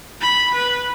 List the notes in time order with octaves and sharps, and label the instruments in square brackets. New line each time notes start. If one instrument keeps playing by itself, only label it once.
[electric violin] B5
B4